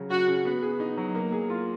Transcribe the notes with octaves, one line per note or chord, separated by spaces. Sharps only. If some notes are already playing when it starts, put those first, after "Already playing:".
Already playing: C#3 F#3
C#4 F#4
C#3
B3
G#4
D#4
F#3
A#3
G#4
F4